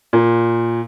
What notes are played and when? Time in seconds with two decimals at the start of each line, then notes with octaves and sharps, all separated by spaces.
0.13 A#2